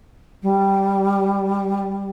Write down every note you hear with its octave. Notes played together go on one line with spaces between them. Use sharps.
G3